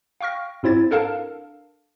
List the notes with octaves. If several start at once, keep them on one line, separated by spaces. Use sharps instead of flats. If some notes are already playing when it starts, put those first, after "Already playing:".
F5 G5 C#6 F6 A#6
G#2 C4 E4 C5 G#6 A6
D4 A4 A#4 F5 A5